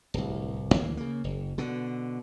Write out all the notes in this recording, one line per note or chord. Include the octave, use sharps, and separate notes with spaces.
D1 C2
D2 E3 A#3
C#3 A#3
F#1
B2 D3